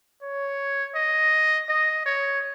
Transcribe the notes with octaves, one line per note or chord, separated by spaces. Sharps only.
C#5
D#5
D#5
C#5